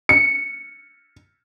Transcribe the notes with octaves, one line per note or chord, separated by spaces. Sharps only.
C#7